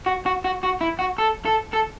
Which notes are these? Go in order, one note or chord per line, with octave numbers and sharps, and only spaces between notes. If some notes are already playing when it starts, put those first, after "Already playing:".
F#4
F#4
F#4
F#4
E4
F#4
A4
A4
A4